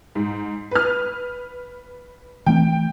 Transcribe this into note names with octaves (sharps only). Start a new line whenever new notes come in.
G#2
B4 F6
E3 A3 C4 G5